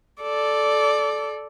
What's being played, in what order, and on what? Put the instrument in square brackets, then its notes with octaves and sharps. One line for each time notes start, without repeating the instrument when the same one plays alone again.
[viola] A4 D5